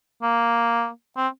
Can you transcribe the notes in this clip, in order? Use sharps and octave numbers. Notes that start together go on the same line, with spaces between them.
A#3
C4